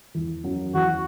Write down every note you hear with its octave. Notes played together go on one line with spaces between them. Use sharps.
E2 E3
F#2 F#3
E2 E3 F#4